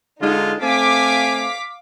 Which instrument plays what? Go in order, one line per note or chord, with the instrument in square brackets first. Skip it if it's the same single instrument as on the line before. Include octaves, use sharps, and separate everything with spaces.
[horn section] D3 G#3 F4 [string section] D#4
[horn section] A3 C4 G#5 [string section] F5 D6 B6